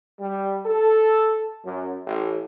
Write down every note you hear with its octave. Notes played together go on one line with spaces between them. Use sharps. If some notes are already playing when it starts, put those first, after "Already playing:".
G3
A4
F#2
A1